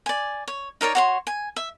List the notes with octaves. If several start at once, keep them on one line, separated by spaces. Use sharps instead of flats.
D5 G#5
C#5
D#4 A#4 C#5 D5
F#4 C#5 C6
G#5
E5